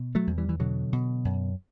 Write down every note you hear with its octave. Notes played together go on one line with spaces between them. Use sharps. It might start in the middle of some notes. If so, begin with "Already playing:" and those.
Already playing: B2
F#3 A3
E2
E3 G3
E3
B2 D3 F#3
B2
F#2